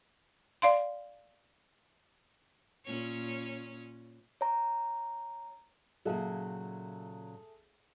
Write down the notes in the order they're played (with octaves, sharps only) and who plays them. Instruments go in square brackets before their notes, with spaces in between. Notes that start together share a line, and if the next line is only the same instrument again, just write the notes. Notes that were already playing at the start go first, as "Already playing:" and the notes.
[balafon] D5 F5 C6
[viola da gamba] A#2 C#4 C#5
[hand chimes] C#5 A#5
[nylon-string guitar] A#2 C#3 F#3 [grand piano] G#4 A4 E5